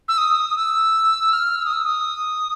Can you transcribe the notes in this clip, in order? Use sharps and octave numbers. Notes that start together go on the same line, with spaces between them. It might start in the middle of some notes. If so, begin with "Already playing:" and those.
E6
D#6
E6
F6
E6
D#6
E6
D#6